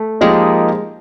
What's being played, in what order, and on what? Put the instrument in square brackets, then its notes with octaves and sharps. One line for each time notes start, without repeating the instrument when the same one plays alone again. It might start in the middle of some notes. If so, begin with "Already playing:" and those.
Already playing: [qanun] A3
[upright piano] F3 A#3 D#4 G4 A#4 [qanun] G#3